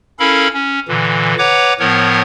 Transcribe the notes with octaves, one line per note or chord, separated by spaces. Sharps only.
C#4 E4 A4 A#4 F5 B5
C#4
A#2 D3 E3
B4 C#5 F#5 A#5 D6
A2 F3 B3 A#4 C#5